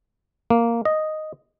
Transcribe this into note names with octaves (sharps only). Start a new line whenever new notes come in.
A#3
D#5